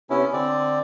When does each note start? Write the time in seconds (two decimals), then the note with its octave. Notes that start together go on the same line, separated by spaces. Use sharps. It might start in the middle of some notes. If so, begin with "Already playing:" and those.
0.10 C3 B3 C#4 E4
0.33 D3 C4 D5